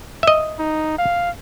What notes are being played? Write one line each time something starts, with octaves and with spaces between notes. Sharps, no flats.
D#5 E5
D#4
F5